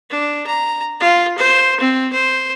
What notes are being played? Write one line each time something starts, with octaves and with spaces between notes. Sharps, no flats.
D4
A#5
F4
C5
C4
C5